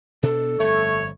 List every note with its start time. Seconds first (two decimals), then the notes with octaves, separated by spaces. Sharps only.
0.23 B2 D4 A4
0.60 G1 F2 A3 C#5